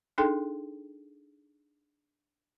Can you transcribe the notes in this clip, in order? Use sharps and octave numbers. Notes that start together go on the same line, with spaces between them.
D4 D#4 G#4 A4 G5 C6